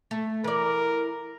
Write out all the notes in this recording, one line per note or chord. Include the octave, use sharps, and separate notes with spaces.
A3
E3 A#4 D5